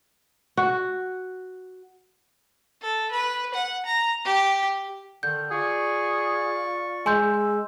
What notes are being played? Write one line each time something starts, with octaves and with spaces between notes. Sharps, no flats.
F#4
A4
B4
F#5
A#5
G4
D3 D#3 G6
F4 G#4 D5 C#6
G#3 G#5 C6 E6 G6